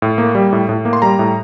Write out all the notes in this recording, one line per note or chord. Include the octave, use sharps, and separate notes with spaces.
A2
A#3
G3
A2
A2
A#3
C6
G3 A#5
A2